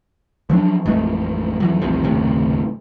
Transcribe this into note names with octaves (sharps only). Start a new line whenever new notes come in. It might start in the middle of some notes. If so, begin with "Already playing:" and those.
F3 F#3 C#4 D4
A1 F2 G#3 A3
F2 E3 F#3
D#1 A1 F2 C3
F#1 D#2 A2 C3